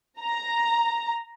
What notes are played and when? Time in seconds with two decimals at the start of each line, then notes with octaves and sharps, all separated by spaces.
0.21 A#5